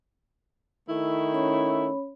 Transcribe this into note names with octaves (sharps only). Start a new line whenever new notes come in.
D#3 A3 E4
C#4 C#5 B5